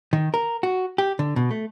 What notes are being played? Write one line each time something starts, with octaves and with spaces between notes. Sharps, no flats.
D#3
A#4
F#4
G4
D3
B2
A3